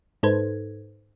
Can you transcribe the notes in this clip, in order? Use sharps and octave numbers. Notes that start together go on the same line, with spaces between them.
G#2 D#4 A4 B4 C5 G#6